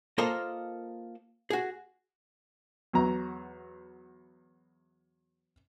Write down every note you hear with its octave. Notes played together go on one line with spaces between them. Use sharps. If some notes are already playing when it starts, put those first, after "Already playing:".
A#3 F4 A4 A#4 C5 D#5
F#4 G#4
E2 F#3 A#5